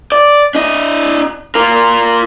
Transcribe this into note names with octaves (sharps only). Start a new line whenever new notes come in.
D5
D4 D#5
F4 A#4